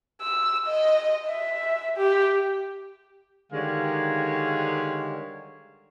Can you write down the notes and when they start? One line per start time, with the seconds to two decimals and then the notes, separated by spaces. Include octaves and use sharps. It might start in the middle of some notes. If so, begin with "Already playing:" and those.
0.21 E6
0.66 D#5
1.28 E5
1.97 G4
3.53 D3 D#3 G3 G#3 C#5 F5